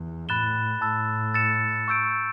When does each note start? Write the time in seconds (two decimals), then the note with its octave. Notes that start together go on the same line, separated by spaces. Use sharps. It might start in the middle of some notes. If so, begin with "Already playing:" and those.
Already playing: E2
0.28 A2 B5 F#6 A6 E7 G7
0.81 A2 A5 E6 A6
1.34 E6 A6 C#7 E7
1.88 C#6 E6 G6 D7